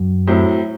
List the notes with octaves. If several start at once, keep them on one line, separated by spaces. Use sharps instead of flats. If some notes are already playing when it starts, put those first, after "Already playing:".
Already playing: F#2
A2 F#3 C4 E4